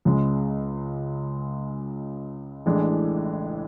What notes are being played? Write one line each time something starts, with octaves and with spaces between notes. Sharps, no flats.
C#2 C#3 G#3
A1 A2 E3 G#3 D4